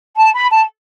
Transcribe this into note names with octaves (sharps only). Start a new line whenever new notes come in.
A5
B5
A5